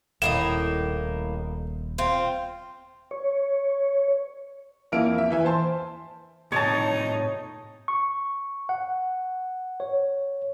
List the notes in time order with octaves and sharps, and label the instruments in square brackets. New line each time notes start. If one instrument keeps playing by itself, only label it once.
[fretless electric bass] D#1 [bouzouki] A2 A#3 D#4 [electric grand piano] E7
[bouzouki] C4 F4
[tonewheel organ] C#5
[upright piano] F2 A#3 E4 F6 D7
E5
E3 E5 G#5
C5 A5 C6
[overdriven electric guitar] A2 C3 [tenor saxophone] D#4 [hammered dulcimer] C#5 A5
[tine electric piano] C#6
F#5
C#5